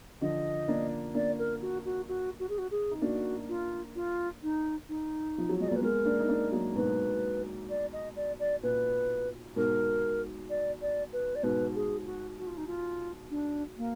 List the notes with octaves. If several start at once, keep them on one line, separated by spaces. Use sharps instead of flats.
D3 F3 D#5
A#3 D4
A#3 D4 D5
A#4
F#4
F#4
F#4
F#4
G#4
F#4
G#4
D#4
A#3 D4 F#4
F4
F4
D#4
D#4
F3
F#3
G#3 D#5
D5
A#3 B4
G#3 B3 A#4
A#3 D4
D#4
A#3 D4
F#3 A#3
G#2 B2 B4
D5
D#5
D5
D5
A#2 B4
G#2 B2 A#4
D5
D5
B4
D5
G#2 B2 B4
G#4
F#4
F#4
F4
D#4
F4
D4
A#3